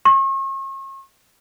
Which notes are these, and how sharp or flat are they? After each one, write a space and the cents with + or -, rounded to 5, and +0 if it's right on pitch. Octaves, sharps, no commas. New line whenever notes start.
C#6 -40